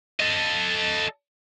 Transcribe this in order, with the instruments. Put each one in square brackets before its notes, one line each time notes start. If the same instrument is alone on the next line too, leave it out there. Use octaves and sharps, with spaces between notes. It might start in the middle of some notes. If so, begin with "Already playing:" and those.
[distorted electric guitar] A4 D#5